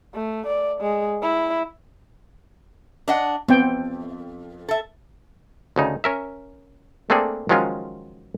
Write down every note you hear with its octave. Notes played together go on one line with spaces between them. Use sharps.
A3
D5
G#3
E4
D4 D#5 F#5
F2 B3 C4 G5
A4 E5
D2 C#3 D#4
C#4 A#4 E5
A3 A#3 C4 D4 G#4 A4
D#3 F3 F#3 G#3 C#4 F4